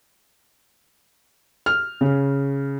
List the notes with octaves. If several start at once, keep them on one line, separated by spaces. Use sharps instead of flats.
F6
C#3